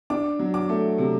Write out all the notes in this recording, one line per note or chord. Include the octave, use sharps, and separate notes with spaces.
D4 D6
F#3
D6
A3
C3